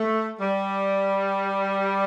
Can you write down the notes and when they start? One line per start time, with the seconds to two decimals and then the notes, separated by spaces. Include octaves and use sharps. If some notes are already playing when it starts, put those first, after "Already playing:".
Already playing: A3
0.40 G3